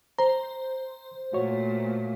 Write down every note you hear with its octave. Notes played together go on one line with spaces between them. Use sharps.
C5 A#5
A#2 A3 F#4 C#5